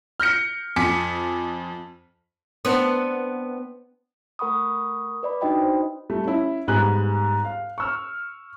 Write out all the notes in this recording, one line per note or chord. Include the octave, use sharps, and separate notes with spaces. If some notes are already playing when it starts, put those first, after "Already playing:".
F6 G6 A#6 C#7
F2 G#5 D6 B6 C#7
B3 C4 D4
A3 A#4 F#5 B5 C#6 D#6
B4 D5 B5
D4 D#4 F#4 D#5 G5 B5
C5
G3 A3
C#4 E4
G#2 G3 B3 G#5 F#6
F5
C#6 E6 F6